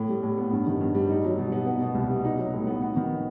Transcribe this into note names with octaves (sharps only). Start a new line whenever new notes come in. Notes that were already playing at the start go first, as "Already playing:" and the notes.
Already playing: A2
G3
A2
B3
G2
D#3
G2
G3
D#4
F#3
B2
B3
B3
B2
C2
G3
D#4
F#3
A2
B3
B3
D#3